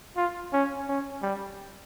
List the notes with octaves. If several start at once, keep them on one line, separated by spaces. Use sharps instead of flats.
F4
C#4
C#4
G3